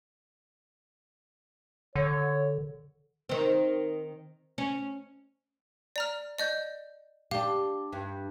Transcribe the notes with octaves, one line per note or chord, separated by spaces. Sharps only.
D3 C#5
D#3 C4
C#4
D5 A#5 F6
D5 D#5 G6
D4 G4 F5
G2